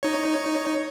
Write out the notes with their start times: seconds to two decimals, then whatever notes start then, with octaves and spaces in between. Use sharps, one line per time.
0.03 D#4 C#5